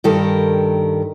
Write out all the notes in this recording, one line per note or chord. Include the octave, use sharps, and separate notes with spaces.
G2 D#3 G4 A4 A#4